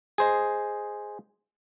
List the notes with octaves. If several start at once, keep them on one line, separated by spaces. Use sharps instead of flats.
G#4 C5 D#5